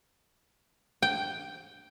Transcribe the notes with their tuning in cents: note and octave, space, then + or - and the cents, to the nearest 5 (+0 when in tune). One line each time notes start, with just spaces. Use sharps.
G5 -5